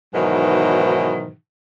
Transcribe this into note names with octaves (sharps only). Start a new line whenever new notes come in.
G#2 B2 D#3 E3 F#3